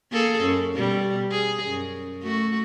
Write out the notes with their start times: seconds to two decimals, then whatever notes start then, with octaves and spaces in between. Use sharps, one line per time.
0.12 A#3 G#4 A4
0.42 F#2
0.75 B2 G3
1.31 G#4
1.67 F#2
2.22 A3 F#4